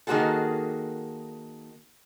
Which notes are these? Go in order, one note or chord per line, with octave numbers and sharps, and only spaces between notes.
D#3 A#3 C4 F#4 G#4 A4